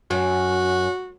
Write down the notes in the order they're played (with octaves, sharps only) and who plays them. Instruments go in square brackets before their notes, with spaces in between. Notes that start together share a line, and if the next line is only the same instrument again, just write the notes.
[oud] F#2 [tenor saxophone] F#4